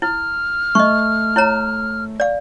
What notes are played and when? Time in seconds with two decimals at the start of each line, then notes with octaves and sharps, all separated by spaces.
0.02 E4 F6
0.75 A3 D#5 C#6
1.36 E4 C#5 A#5
2.20 D5 F5